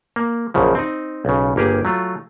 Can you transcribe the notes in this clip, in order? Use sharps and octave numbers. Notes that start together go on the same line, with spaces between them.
A#3
A#1 F#2 C#3 F3
C4 D#4
B1 C#3
G1 A#3 G4 G#4
F#3 A3 F4